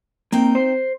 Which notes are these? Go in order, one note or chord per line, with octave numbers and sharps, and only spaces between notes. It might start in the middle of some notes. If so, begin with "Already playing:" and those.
A#3 C4 D#4 G5
C5